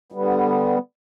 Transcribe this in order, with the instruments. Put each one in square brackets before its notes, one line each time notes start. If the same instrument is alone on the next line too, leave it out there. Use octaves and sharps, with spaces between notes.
[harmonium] D3 G3 B3